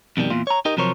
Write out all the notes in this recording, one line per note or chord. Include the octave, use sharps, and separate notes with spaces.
F2 B2 D#3 G3
E2 A#2 F4
C#5 A#5
D#4 G4 A#4 D#5
C3 F3 F#3 A#4 C5 C#5